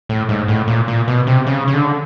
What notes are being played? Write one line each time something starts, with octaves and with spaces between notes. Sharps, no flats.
A2
G#2
A2
A#2
A#2
B2
C3
C#3
C#3
D3